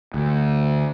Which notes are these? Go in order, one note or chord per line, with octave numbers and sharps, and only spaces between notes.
D2